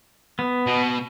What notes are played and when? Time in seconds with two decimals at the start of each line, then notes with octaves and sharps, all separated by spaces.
0.39 B3
0.67 B2